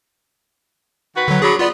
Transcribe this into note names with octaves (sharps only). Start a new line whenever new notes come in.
D#3 F#4 B4
D3 F#3
D3 F#3 G#4 B5
B3 F4 D5